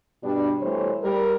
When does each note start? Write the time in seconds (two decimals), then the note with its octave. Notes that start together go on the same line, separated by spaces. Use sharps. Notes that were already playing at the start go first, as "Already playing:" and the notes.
0.23 G2 B2 G3 D4
0.61 B2 E3 G3 A3 C5 C#5
1.03 G3 A#4